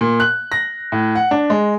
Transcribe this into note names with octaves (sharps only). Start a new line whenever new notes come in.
A#2
F#6
A#6
A2
F#5
D4
G#3